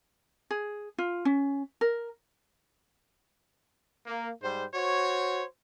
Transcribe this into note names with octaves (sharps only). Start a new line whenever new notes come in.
G#4
F4
C#4
A#4
A#3
G#2 G3 C5
F#4 C5 C#5